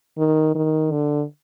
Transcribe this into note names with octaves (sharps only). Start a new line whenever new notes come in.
D#3
D#3
D3